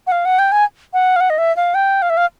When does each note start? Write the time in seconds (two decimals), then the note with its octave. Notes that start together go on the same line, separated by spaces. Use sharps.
0.07 F#5
0.12 F5
0.25 F#5
0.39 G5
0.52 G#5
0.93 F#5
1.16 F5
1.20 F#5
1.30 D#5
1.38 E5
1.56 F5
1.74 G5
2.02 F5
2.10 E5
2.17 F5